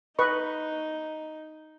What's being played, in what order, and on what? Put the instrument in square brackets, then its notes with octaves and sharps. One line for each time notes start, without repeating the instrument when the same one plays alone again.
[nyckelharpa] D#4 [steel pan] B4 D#5 C#6